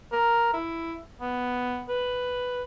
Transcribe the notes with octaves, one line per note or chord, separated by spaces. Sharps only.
A#4
E4
B3
B4